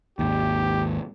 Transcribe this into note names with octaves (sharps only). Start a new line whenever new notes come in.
G#1 D#2 G4